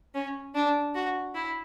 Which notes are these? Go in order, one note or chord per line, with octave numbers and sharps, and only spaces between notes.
C#4
D4
F#4
E4